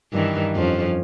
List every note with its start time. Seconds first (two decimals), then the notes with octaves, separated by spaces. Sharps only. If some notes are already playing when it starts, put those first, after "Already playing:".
0.13 G2 D#3 E3
0.56 F2 F3 C#4